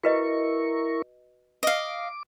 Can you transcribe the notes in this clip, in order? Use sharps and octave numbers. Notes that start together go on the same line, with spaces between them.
E4 F#4 A#4 B4 D#5 C#6
D#5 F5 D6